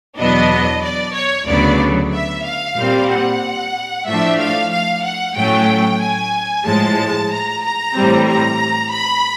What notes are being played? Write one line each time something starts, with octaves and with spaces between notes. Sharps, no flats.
E2 B2 F#3 B3 D4 D#5
D5
C#5
D2 C#3 F#3 B3 D5
E5
F5
A#2 G3 C4
F#5
A2 F3 A3 D4 E5
F5
F5
F#5
A2 F#3 A3 C#4 G5
G#5
A2 F3 G#3 A5
A#5
A#5
A2 E3 G3 C4
A#5
B5